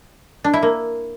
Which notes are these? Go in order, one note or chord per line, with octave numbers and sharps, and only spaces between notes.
D4
E4
A#3